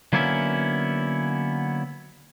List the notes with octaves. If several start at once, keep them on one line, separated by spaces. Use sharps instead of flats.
D3 F#3 A#3 B3 C#4 E4